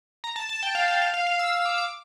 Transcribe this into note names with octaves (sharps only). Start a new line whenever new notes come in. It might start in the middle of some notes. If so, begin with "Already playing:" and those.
A#5
A5
A5
G5
F5
F5
F5
F5
F5
E6
E6
D6
D6